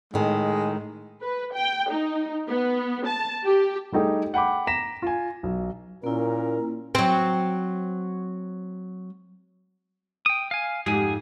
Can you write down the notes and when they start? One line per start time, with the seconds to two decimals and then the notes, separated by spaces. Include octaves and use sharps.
0.14 A2 D#3 G#3
1.21 B4
1.55 G5
1.90 D#4
2.48 B3
3.06 A5
3.45 G4
3.92 G3 A3 D#4 G4 G#4
4.34 F#5 G5 B5 D6
4.67 A#5 A#6 B6 E7
5.02 F4 G#5
5.43 B1
6.04 A#2 A#3 C#4 E4 A#4
6.95 F#3 C4
10.26 G5 D#6
10.51 F5 G#5
10.86 F2 G#2 G4 G#4 G#5